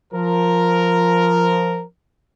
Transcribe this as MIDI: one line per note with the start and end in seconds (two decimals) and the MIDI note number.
0.13 1.84 53
0.13 1.84 70